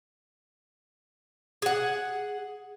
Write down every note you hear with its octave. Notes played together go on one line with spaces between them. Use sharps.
G#4 F#5